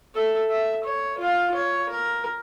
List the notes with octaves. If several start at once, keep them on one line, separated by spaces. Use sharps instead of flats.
A4 E5
E5
C#5
F4 F5
C#5
A#4